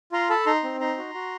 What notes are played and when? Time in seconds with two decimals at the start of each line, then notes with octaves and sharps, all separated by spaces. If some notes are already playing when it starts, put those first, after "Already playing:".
0.12 F4 A#5 C6
0.30 A4 A5 B5
0.46 D#4 A#5 C6
0.64 C4
0.80 D#4 A#5 C6
0.98 F#4
1.14 F#4